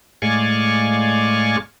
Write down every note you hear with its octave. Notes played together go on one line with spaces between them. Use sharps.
A2 G#3 D5 F5 G#5 C#6